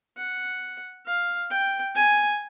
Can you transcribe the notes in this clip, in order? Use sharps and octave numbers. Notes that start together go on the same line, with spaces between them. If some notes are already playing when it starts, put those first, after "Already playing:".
F#5
F5
G5
G#5